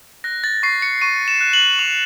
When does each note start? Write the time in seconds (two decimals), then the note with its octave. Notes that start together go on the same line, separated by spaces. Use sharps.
0.24 F#6 A#6
0.44 A6
0.63 C#6 C7
0.82 C#7
1.01 C#6 D#7
1.28 E7
1.41 F#6
1.53 F#7
1.79 C#6 F7